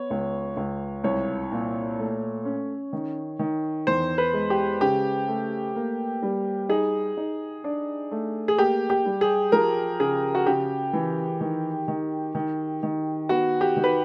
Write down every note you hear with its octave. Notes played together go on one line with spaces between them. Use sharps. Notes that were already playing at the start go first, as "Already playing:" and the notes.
Already playing: B3 C#5
C#2
C#2
C2 C#5
A#2
A3
C#4
D#3
D#3
E2 C5
B4
G#3
G4
C#3 G4
A3
A#3
G3
D#4 G#4
D#4
D4
A3
G#4
A#3 G4
G4
G3
G#4
F3 A#4
C#3 G#4
F#4
C#3 G4
E3
D#3
D#3
D#3
D#3
B3 F#4
G4
D#3
B4